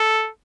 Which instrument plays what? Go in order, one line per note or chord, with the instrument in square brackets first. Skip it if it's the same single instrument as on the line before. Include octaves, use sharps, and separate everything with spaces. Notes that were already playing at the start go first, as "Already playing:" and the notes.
Already playing: [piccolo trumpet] A4